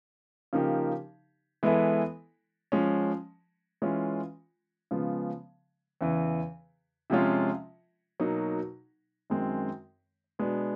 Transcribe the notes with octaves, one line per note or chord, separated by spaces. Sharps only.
C#3 F3 A#3 D#4 G4
E3 G#3 B3 E4 A4
F3 G#3 C#4
E3 G#3 C#4 F4
C#3 F3 G#3 B3
E2 C#3 E3
C3 F3 G#3 C#4 F4
B2 F#3 A#3 D#4
F#2 D#3 G#3 C4
B2 G#3 B3 D4